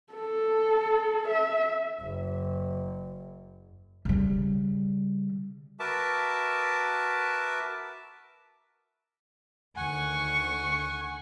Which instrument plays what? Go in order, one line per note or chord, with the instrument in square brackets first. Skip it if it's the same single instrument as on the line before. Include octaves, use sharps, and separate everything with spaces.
[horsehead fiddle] A4
E5
[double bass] F#1 F#2
[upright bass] C#3 G3
[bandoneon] F#4 A#4 B4 E5 A5 D6
[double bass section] D2 D#3 [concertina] F#5 G#5 [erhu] C#6